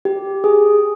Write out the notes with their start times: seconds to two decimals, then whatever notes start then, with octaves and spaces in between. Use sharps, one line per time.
0.05 G4
0.44 G#4